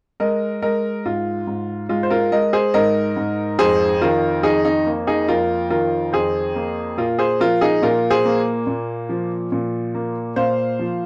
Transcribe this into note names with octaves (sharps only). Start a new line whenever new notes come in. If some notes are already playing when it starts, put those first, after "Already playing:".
G#3 A#4 D#5
G#3 A#4 D#5
G#2 F4
G#2
G#3 F4
C5
F4 A#4
G#3 A#4 D#5
G#4 C5
G#2 A#4 D#5
G#2
F2 G#4 C5
D#3 F4 A#4
F2 D#4 G#4
D#4
A#3
D#4 G#4
F2 F4 A#4
D#3 F4 A#4
F2 G#4 C5
A#3
A#2 F4 A#4
G#4 C5
F3 F4 A#4
D#4 G#4
A#2 F4 A#4
G#4 C5
A#3
A#2
F3
A#2
A#3
A#2 C5 F5
F3